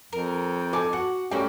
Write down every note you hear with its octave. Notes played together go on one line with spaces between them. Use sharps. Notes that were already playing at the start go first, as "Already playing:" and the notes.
F2 A#4
A4 G#5 A5 D6
F#4 F#5
G3 A3 A#3 C#4 F#4 G4